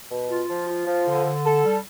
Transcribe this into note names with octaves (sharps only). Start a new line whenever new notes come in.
B2
F4
F3
F4
F3
D3
D3
A4
G3